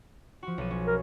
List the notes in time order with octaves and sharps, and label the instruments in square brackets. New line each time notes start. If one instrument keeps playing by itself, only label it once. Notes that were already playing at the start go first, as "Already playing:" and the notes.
[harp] F3 F#4
B1 D#7
C#4
[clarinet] A#4